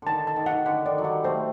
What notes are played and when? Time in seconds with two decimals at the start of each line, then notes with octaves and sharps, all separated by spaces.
0.02 D3 D#3 A5
0.27 A5
0.36 D#3
0.46 D#3 F#5
0.65 D3 F#5
0.86 D#3 D5
0.98 F#3
1.04 G3 F#5
1.24 A3 C5